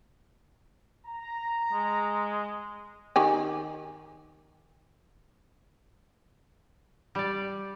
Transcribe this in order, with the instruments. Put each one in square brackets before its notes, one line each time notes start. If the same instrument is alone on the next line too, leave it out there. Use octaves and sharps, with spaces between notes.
[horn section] A#5
[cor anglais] G#3
[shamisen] D#3 G4 G#5
[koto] G3 D5